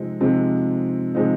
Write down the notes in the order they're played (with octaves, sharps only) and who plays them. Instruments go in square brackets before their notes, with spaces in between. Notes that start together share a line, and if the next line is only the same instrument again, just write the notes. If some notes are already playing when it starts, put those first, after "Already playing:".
Already playing: [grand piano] C3 F3 G#3 C4 D#4
C3 F3 G#3 C4 D#4
C3 F3 G#3 C4 D#4